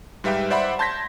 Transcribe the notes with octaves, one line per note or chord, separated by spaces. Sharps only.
G#2 G3 B4 E5 F5 G5
C5 D5 E5 F#5 B5 C6
A5 C6 G6 G#6 A#6 B6